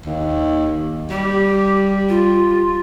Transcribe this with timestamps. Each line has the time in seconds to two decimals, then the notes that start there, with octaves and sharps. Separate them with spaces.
0.05 D#2
1.11 G3 G4
2.09 F4